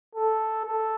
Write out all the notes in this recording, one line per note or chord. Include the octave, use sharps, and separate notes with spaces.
A4
A4